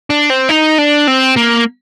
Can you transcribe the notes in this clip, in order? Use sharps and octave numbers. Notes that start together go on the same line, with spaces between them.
D4
C4
D#4
D4
C4
A#3